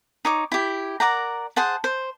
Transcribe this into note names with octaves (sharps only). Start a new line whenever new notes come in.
D#4 C#5 D6
E4 G4
A#4 D5 F#5 A#5
G#4 C5 F#5 A5
C5